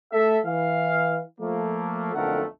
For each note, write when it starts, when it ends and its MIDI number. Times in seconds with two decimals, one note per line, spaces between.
0.13 0.38 57
0.13 0.38 69
0.13 0.38 76
0.46 1.20 52
0.46 1.20 77
1.41 2.14 53
1.41 2.14 57
1.41 2.14 58
2.15 2.44 35
2.15 2.44 41
2.15 2.44 50
2.15 2.44 57
2.15 2.44 70
2.15 2.44 78